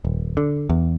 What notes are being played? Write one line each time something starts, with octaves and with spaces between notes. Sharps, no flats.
D#1
D3
E2